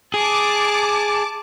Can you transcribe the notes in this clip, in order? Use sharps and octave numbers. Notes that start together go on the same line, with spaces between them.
G#4 A5 D6